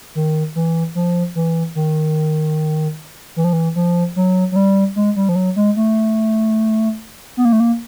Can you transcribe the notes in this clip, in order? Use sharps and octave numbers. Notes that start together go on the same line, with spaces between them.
D#3
E3
F3
E3
D#3
E3
F3
E3
F3
F#3
F#3
G3
G#3
G3
F3
F#3
G#3
A3
B3
A#3
A3
A#3